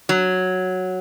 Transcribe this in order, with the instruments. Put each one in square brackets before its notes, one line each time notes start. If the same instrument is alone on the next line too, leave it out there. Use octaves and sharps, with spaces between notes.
[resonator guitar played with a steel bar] F#3